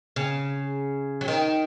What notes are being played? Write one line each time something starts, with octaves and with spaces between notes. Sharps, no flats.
C#3
F#3
D#3